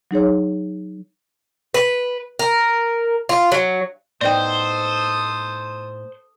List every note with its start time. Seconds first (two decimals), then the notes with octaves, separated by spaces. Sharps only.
0.11 F#3 D#4 G#4 C#5
1.74 B4
2.39 A#4
3.29 F4
3.52 F#3
4.21 A2 B3 D#4 A4 C5 D5 G5 D#6